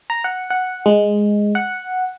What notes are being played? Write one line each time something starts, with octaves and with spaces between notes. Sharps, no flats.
A#5
F#5
F#5
G#3
F#5